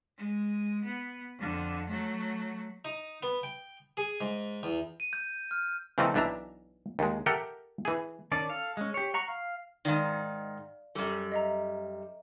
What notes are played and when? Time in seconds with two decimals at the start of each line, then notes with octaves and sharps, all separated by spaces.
0.17 G#3
0.84 B3
1.38 F2 D3
1.88 F#3 A3
2.85 D#4
3.23 B3
3.43 G5
3.97 G#4
4.21 G#2
4.63 E2
5.00 D#7
5.13 G6
5.51 F6
5.98 C#3 E3 F3 A3 C4 D#4
6.14 B1 E3 D4 E5 A#5
6.99 D#2 G#3
7.26 G4 A4 A#4 E5 F#5 G5
7.85 E3 G#4
8.31 D#3 C#4 D5 A5
8.49 A4 F5
8.77 G#3 C#4
8.94 G4 C#5
9.14 F#5 A#5 C#6
9.28 F5
9.85 G#2 D#3 D5 F5
10.95 F#2 G3 A4
11.32 D#5 E5 A#5